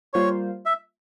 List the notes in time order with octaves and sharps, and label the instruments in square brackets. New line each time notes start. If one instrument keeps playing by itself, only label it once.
[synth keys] G3 A#3 F4 C5 [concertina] C#5
[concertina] E5